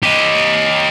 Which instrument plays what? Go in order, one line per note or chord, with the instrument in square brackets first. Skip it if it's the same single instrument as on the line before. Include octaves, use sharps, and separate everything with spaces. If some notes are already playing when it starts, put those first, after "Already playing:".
[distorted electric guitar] G4 D#5